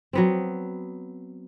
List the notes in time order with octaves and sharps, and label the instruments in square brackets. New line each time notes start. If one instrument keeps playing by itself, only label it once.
[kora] F#3 B3 C4